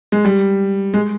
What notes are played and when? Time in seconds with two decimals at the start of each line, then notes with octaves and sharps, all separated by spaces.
0.12 G#3
0.25 G3
0.94 G#3